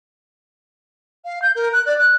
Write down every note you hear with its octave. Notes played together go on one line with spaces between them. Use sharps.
F5
G6
A#4
F#6
D5
F#6